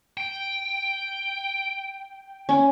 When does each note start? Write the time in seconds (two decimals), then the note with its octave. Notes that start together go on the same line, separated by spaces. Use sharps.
0.17 G5
2.49 C#4